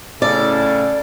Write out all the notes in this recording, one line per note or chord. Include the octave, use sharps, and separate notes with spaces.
A2 C#3 A4 D5